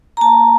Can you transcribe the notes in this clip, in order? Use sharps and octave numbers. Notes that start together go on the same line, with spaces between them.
A#5
A#3 A5